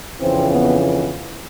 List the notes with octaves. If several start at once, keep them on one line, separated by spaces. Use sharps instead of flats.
F2 C#3 E3 C4
B3